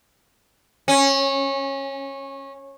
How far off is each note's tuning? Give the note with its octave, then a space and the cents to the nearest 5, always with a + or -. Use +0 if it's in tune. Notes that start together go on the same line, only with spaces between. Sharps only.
C#4 -20